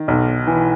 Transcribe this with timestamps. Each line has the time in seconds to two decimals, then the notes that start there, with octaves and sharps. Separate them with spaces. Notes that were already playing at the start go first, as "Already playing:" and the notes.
Already playing: D#3
0.08 B1
0.47 E3